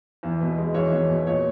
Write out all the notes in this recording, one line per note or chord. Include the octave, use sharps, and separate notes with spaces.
E2
B2
G#3
E2 C#5
E2
B2
A#2 C#5